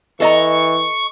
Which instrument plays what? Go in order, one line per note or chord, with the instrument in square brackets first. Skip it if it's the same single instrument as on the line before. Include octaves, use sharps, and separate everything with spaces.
[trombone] E3 [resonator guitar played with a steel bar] A4 D#5 A#5 [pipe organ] C#6